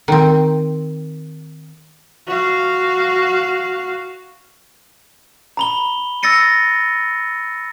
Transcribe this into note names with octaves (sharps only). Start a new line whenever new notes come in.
D#3 C4
F#4 F5
A#5 B5 G7
E6 A6 A#6 C#7 D#7